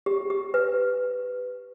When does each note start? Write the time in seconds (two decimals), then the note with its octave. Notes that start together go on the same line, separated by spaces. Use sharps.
0.06 G4
0.30 G4
0.54 B4